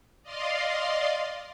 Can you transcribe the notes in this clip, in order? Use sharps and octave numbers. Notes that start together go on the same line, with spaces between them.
D5 D#5 F5 C6